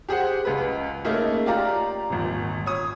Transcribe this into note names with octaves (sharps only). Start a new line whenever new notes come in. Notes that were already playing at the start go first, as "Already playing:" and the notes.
G4 G#4 C5 F#5
C#2 B4
A3 A#3 C#4 D#4 G#4 A#4
F4 G4 D5 F5 A#5
D#1 G#1
C#5 D#6